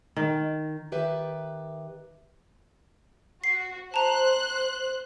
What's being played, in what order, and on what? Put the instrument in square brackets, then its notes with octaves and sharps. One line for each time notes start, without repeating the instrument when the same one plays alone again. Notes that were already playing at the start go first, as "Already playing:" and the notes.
[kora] D#3
[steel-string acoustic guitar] D#3 G4 B4 E5
[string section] F#4 [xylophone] C7
[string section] C5 F#6 [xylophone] A5 A#5